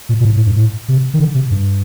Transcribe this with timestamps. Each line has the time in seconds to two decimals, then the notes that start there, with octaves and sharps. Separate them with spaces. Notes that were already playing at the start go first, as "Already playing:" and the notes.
0.09 A#2
0.20 A#2
0.25 A2
0.36 A2
0.46 G2
0.56 A2
0.88 C3
1.14 D#3
1.20 D3
1.35 C3
1.51 G2